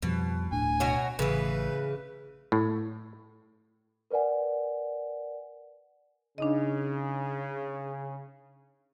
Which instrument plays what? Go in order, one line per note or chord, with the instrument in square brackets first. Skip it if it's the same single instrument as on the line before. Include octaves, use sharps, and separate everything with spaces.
[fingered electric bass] F2 F3 G3 [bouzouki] B2
[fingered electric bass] D1 A2 D4 [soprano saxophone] G#5
[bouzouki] B2 F#4 C#5
[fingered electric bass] A1 [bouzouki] C#3 E3 [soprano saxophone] B4
[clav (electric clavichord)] A2
[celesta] A#4 B4 D5 F#5 G#5
[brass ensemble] C#3 [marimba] D4 D#4 D#5